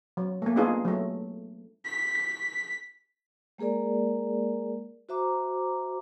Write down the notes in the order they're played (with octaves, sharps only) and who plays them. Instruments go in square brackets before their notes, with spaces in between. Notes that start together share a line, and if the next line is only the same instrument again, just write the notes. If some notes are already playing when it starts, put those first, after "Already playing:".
[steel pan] F#3
A3 A#3
B3 D4 D#4 F4 G#4
F#3 A3
[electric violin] B6
[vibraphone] G#3 A#3 G#4 A#4 D5
F#4 C5 E5 A#5 D6